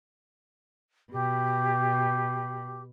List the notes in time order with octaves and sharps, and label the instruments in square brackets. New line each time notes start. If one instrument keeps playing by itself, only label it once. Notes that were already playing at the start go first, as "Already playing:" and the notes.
[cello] B2 [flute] G4